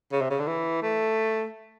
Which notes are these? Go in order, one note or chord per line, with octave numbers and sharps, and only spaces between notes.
C#3
C3
C#3
D3
E3
A3